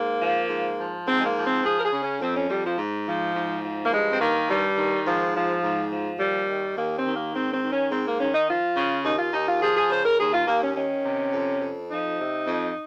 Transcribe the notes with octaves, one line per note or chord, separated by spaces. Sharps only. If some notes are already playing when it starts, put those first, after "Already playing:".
Already playing: G#2 A#3
F3
G#2
F3
G#2 C4
G#3
A#3
F3
C4
F3 G#4
A#4
G#4
C#3
C#4
F2 C4
C#4
F2 G3
F3
G#2
F3
G#2
F3
A#3
G2 G#3
C4
D#3 A#3
G2 G3
D#3
G#2 F3
F3
G#2
F3
D#2 G3
D#3
D#2 A#3
C4
D#3
A#3
G#2 C4
C4
D#3
C#4
G#2 C4
A#3
D#3 C#4
D#4
F3 F4
C#3
D#2 D#4
F4
D#2 D#4
F4
F3 G#4
G#4
C#3 C5
A#4
D#2 G#4
F4
D#2 A#3
C#4
D#3 C#4
C3
F2
F2
F3 D#4
C3
F2